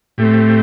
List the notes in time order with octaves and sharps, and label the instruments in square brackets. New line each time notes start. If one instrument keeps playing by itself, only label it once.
[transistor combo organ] A2 A3 C4 G4